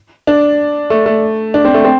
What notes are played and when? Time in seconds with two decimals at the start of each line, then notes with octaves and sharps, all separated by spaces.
0.27 D4
0.90 A3
1.06 A3
1.54 D4
1.65 C4
1.74 A3
1.85 C4